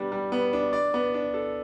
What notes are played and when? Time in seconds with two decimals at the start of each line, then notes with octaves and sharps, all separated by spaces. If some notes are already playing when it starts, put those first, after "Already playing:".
Already playing: G3 B3 D4
0.12 G3
0.32 B3
0.53 D4
0.73 D5
0.94 B3
1.14 D4
1.34 A4